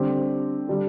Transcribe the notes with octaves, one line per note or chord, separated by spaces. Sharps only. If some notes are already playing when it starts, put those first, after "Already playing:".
Already playing: D3 G3 C4 G4
D3 G3 D4